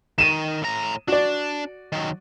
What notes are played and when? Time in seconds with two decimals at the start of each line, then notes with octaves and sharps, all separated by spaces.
0.18 D#3 D#7 E7
0.62 A2 A#5
1.08 D4 F#4 D5
1.92 D#3 F#3